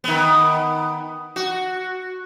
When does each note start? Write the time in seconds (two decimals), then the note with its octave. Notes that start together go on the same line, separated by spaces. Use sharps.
0.04 D#3 B3
1.36 F#4